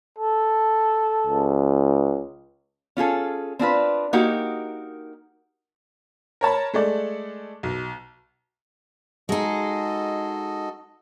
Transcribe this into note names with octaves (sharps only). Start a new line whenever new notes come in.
A4
C#2
C#4 F4 G#4 A4
C4 D4 F4 B4
A#3 D#4 F#4 G4 A#4
A#4 C#5 A5 B5
G#3 A3 A4 D5
B1
G#3 D#4 F#4 A4 D#5